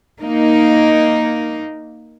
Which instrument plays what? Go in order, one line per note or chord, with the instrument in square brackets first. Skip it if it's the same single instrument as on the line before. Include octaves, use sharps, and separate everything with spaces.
[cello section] A#3 D#4